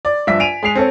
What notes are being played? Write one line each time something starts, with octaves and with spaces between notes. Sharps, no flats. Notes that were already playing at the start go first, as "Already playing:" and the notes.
D5
A#1 G2 E5 E6 B6
G#5 D7 D#7 F7
G#3 G#4 C7 F7
C4 A4 C#5